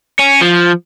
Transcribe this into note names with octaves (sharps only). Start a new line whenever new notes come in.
C#4
F3